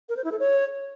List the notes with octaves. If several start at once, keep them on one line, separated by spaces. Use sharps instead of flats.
A#4
C5
E4
A4
C#5